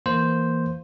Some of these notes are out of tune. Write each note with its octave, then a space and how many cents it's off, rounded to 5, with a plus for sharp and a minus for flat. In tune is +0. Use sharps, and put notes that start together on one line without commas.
E3 +0 A#3 +0 C5 +0